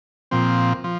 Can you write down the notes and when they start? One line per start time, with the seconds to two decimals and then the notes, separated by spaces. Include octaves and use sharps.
0.31 A#2 F3 C4
0.84 F3